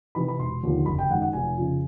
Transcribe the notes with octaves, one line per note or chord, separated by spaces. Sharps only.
C3 E3 B5
B5
E1 C6
D#2 D3 F3
F#1 B5
G5
F#2 D#3 G#3 F#5
F#5
F1 G#5
F2 C#3